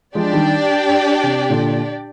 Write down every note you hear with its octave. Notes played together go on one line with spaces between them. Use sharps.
F3 G#3 D4 G4 D5 G5
D#3 G3
C3
A#2 D3